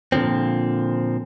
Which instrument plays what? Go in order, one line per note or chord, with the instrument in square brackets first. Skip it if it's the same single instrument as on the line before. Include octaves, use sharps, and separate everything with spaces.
[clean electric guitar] A#2 D3 F3 C4